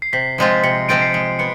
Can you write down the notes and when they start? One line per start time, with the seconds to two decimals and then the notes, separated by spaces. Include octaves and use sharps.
0.02 C7
0.13 C3 B6
0.38 F3 G#3 C4 F4
0.64 C3 C#7
0.89 F3 G#3 C4 F4 D7
1.02 C7
1.13 G#3 C#7
1.39 B3 C#7